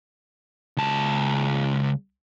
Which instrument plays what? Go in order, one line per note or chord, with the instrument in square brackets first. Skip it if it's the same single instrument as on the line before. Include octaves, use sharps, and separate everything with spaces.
[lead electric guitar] C#2 A5